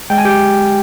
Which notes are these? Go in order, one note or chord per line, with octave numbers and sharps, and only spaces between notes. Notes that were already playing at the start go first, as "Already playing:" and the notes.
G#3 G5
G#5
G4 G5